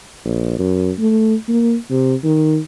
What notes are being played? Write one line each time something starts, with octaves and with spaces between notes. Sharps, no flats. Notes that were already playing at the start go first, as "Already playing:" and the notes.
A#1
F#2
A3
A#3
C3
D#3